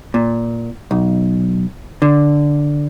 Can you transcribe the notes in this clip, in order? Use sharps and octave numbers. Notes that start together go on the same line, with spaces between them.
A#2
B1
D3